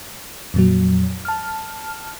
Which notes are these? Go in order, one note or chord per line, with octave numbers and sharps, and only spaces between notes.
F2 A#2 F#3
A5 F6